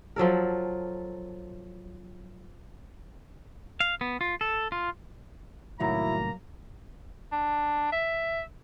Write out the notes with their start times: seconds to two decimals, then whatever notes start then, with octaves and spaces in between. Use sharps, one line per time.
0.16 F3 F#3 A4 A#4
3.80 F5
4.01 B3
4.21 F4
4.41 A4
4.72 F4
5.80 C2 A2 D#3 F#3 A#3 E4 A#5
7.32 D4
7.92 E5